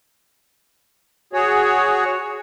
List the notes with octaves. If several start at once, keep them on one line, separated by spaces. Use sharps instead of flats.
F#4 G#4 C#5